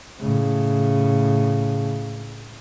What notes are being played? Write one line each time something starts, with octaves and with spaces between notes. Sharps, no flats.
A2 C#3